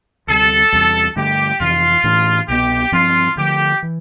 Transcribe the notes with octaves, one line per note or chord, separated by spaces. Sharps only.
D2 C3 G3 A4
E2 C3 G3
G2 D3 A3 G4
F2 C3 E3 F4
A2 E3 A3 D4
C2 B2 B3 G4
G2 F3 C4 F4
D2 D3 F3 A3 G4
E3